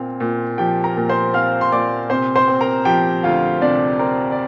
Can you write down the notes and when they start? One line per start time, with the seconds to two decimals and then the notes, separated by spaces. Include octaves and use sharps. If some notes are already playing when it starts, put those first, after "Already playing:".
Already playing: A#2 C4 F5
0.20 A#2
0.58 F3 G4 G5
0.84 A#4 A#5
0.97 A#2
1.09 C5 C6
1.34 C4 F5 F6
1.61 C6
1.72 A#2 D5 D6
2.10 C3 C5 C6
2.36 C5 C6
2.48 C4
2.61 A#4 A#5
2.85 F3 G4 G5
3.23 D2 F4 F5
3.62 C3 D4 D5
3.99 C4 A#4
4.32 D5